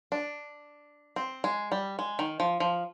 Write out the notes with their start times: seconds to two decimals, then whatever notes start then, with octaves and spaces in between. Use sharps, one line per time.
0.12 D4
1.16 C4
1.44 G#3
1.72 G3
1.99 G#3
2.19 D#3
2.40 F3
2.60 F3